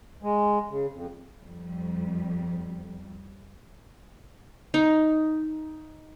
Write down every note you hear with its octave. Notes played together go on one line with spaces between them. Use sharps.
G#3
C#3
F2
F2 G3
D#4